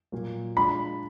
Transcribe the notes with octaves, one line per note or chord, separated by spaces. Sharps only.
A#2 F#3 A#3
G#3 D4 F4 B5